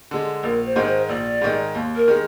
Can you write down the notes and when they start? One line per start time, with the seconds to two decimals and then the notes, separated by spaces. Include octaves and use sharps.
0.11 D3 G#3
0.43 A#1 A#4
0.65 C5
0.76 G#2 D#3 G#3
0.87 C5
1.09 A#1 D5
1.42 G#2 D#3 G#3
1.75 D#2
1.96 A#4
2.08 D#3 G#3